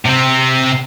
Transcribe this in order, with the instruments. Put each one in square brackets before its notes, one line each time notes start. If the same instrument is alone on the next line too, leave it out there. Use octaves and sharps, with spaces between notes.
[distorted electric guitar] C3 C4